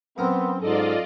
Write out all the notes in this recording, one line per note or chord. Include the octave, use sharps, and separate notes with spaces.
F#2 B3 C4 A#4
G#2 F4 A4 D5 D#5